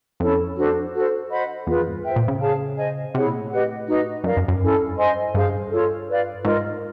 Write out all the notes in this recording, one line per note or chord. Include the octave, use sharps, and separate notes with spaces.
F2 C#4 E4 A4 C#5
D4 F#4 A4 C5
F#4 A4 C5
C5 D#5 F#5 B5
E2 F4 G#4 B4
F2
G#2
G2
C5 E5 G5
A#2
C#3
G#4 C#5 F5 A5
C5 D#5 G#5
C3 E4 G#4 C#5 F#5
A#2
A2
G4 B4 D#5 F#5
D#4 F#4 B4 D#5
F#2 A#4 D5 F5
F#2
F#2
G2 C#4 E4 A4
C5 D#5 G#5 C6
G2 G#4 C5 F5
F4 A4 C#5
B4 D5 F5
G#2 F4 A#4 D#5